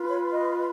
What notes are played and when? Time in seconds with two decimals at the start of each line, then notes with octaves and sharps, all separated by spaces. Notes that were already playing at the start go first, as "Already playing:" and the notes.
Already playing: F4 B4
0.09 C#5
0.32 D#5